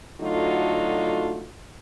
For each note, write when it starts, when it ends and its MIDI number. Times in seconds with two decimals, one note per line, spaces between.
0.21 1.49 50
0.21 1.49 54
0.21 1.49 57
0.21 1.49 63
0.21 1.49 65
0.21 1.49 66